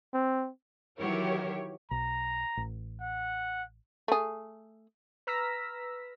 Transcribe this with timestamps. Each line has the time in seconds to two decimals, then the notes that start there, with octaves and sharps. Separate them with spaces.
0.14 C4
0.98 D#3 E3 F#3 G4 A#4 C#5
1.91 B1 A#5
2.57 A1
3.01 F#5
4.08 A3 G#4
5.27 B4 A#5 E6 F6 A#6 B6